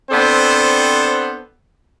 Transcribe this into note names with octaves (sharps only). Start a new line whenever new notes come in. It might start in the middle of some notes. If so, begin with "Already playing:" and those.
B3 C4 D4 A4 C5